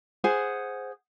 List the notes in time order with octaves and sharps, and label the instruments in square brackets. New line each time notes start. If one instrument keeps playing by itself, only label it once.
[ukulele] G#4 C5 F#5